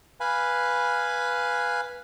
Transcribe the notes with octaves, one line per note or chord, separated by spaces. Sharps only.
B4 F5 G#5 B5